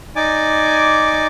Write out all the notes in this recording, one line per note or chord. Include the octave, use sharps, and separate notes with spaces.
D#4 D5 G#5 D6